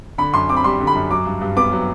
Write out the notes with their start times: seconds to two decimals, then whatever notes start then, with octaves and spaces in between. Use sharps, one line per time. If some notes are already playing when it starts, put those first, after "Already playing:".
0.18 D3 B5
0.34 F#2 C6
0.49 C4 D6
0.57 B5
0.64 G3 C6
0.80 D3
0.87 B5
0.95 F#2
1.11 F#3 D6
1.26 G2
1.41 G2
1.56 B3 D6
1.72 F#3